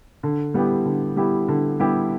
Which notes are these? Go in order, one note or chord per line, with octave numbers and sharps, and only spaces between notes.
D3
G3 B3 E4 G4
D3
G3 B3 E4 G4
D3
G3 B3 E4 G4